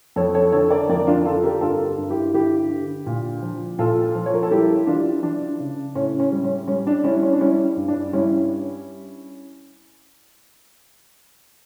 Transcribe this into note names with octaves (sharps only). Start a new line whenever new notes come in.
F2 A4 C#5
A4 C#5
D3 A4 C#5
A#4 D5
F2 A#4 D5
D4 F4
D3 F4 A4
G4 A#4
G2 F4 A4
G2
E4 G4
D3 E4 G4
D3
A#2
F3
A#2 F4 A4
F3
C#5
A#4
A4
G3 E4 G4
E3 D4 F4
E3 D4
C#3
A2 C#4
C#4
G3
C#4
G3 C#4
D4
G3 C#4 E4
C#4
D4
G3 C#4 E4
G2
D4
G3 C#4 E4